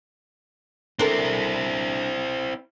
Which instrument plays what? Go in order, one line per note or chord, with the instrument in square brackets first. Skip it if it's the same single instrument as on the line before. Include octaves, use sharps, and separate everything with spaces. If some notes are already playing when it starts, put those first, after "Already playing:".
[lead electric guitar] C4 E4 [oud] D4 A4 A#4